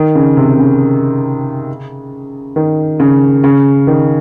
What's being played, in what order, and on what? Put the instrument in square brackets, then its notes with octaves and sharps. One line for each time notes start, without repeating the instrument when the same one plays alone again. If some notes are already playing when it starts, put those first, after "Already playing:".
Already playing: [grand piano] D#3
C#3
C3
C#3
D#3
C#3
C#3
D#3